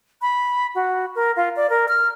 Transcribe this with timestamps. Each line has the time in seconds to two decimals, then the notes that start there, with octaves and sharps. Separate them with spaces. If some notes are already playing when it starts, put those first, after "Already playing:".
0.22 B5
0.75 F#4
1.15 A#4
1.36 F4
1.56 D5
1.70 A#4
1.88 F6